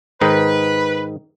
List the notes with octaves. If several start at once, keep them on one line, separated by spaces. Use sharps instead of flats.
G#2 D#3 D#4 B4